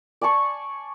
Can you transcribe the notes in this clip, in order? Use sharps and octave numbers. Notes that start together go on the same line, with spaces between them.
D5 G#5 A5 C#6